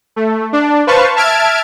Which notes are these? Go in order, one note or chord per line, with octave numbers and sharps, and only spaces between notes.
A3
D4
B4 C5 F5 A5 C#6
E5 A5 F6 G#6 D7